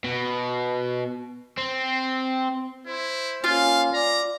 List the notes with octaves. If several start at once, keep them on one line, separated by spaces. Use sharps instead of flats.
B2
C4
E4 C5
A#3 C#4 F4 F5
D5 A#5